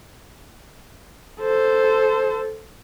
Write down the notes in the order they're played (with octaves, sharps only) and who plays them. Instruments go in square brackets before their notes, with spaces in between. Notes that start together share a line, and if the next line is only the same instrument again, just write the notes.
[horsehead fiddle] A4 C5